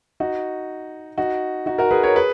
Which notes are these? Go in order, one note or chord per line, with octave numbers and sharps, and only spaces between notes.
D#4 F#4
D#4 F#4
D#4 F#4
F#4 A#4
G#4 B4
A#4 C#5
G#4 B4